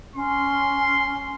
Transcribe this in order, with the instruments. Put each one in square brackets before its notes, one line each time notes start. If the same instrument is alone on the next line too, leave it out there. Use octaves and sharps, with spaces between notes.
[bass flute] C#4 [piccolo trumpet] C6